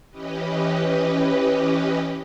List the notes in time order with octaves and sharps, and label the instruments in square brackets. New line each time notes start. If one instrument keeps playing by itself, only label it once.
[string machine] E3 C#4 G4 B4 D#5